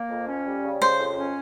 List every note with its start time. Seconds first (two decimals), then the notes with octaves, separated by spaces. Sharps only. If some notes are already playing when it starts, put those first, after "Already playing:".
Already playing: A#3
0.10 F2
0.27 C#4
0.46 G3
0.64 C#3
0.81 C#3 C5
0.99 F2
1.17 C#4